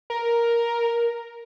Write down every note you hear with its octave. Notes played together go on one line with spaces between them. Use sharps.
A#4